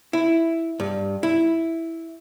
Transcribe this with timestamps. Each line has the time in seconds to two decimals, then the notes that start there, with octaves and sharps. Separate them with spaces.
0.13 E4
0.80 G2
1.23 E4